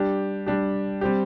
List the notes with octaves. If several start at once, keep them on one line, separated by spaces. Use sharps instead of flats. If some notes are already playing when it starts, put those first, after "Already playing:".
Already playing: G3 D4 G4
G3 D4 G4
G3 C4 G4